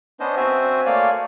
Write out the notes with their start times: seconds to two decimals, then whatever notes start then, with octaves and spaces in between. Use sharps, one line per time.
0.20 B3 C#4 D4 C5 D#5
0.37 C4 F#4 C5 E5 G#5
0.86 A3 A#3 C#5 D5 F5 G#5